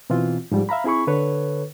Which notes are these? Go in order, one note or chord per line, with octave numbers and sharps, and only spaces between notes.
B2 E3 C4 F4
G#2 F3 G3
E5 F5 A#5 B5
C4 E4 G#4 B5 C#6
D3 A4 B4 C#5